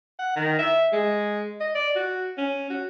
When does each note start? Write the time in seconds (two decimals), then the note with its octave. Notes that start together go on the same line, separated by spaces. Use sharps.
0.19 F#5
0.36 D#3
0.59 E5
0.93 G#3
1.60 D#5
1.75 D5
1.96 F#4
2.38 C#4
2.70 F#4